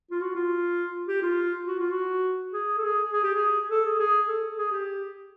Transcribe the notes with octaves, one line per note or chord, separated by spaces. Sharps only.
F4
F#4
F4
G4
F4
F#4
F4
F#4
G#4
A4
G#4
G#4
G4
G#4
A4
G#4
G#4
A4
G#4
G4